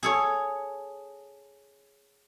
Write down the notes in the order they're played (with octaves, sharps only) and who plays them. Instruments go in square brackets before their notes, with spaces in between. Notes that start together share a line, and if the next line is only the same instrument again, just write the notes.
[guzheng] G#4 A4 C#5